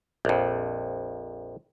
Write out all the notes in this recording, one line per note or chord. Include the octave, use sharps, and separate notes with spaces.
A#1 F2